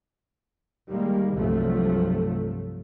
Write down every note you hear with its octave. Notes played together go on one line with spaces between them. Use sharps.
D#3 G3 G#3 A#3
C2 G2 C3 F3 F#3 A3